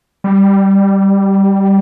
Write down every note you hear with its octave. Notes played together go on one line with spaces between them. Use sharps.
G3